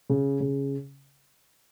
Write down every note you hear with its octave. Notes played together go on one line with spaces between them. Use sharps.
C#3
C#3